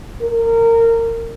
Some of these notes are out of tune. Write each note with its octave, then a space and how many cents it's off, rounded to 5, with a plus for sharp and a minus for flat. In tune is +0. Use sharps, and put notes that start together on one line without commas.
A#4 -20